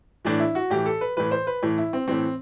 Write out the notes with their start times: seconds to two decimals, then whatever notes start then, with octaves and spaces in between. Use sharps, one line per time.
0.25 A2 E3 D4
0.40 E4
0.55 F#4
0.70 A2 E3 G4
0.86 A4
1.01 B4
1.17 A2 E3 B4
1.31 C5
1.47 B4
1.63 A2 E3
1.78 E4
1.93 C4
2.08 A2 E3 C4